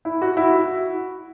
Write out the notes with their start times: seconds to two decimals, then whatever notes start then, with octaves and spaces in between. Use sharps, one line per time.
0.05 E4
0.22 F#4
0.37 E4
0.52 F#4